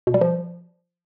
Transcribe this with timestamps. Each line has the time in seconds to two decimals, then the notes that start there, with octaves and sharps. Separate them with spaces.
0.07 B2
0.14 G3
0.21 F3